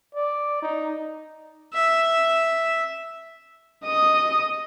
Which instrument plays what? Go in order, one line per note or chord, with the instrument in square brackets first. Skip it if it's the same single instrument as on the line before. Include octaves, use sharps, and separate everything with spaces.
[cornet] D5
D#4
[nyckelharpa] E5
[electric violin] D#5 D#6